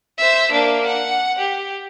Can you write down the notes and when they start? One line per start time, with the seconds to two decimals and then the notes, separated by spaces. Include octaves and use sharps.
0.18 C5 E5
0.53 A#3 D4
0.86 F#5
1.39 G4